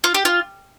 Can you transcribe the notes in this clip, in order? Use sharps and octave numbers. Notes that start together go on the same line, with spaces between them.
F4
G4
F4